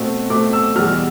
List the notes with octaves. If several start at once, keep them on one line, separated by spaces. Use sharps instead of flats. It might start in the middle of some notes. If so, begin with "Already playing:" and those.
Already playing: B2 A3 C4
B2 A3 C4 D6
E6
E2 B2 G3 F6